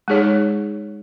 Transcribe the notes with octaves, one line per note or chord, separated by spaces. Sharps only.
G#3 D#4 G#4 C#5